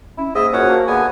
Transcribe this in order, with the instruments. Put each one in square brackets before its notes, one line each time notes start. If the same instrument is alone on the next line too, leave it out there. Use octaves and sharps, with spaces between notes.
[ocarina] C#4 [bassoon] E4
[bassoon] G#2 [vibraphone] A#3 [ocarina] G#4 [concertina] D#5 E5
[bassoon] F#2 [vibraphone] A#3 F4 F#4 [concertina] C#4 C#5 F#5 [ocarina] C5
[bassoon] A#3 [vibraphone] A5
[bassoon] D2 [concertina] B3 G#5 [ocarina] G#4